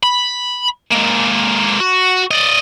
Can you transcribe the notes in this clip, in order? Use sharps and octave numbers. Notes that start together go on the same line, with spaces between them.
B5
G#3 A#3
F#4
D5 D#5